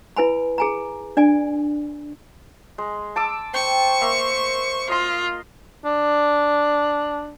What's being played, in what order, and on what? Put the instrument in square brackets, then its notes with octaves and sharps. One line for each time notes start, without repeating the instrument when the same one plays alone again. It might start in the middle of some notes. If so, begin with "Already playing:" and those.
[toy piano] E4 B4 G#5 B5
G#4 G#5 A#5
D4 D5 G#5
[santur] G#3
A5 D6 E6
[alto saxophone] C5 [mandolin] G5 [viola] C#6
[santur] A#3 E5
[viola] F4 [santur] D#5 C6
[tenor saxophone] D4